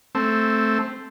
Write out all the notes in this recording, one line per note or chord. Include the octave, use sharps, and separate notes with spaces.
A3 C4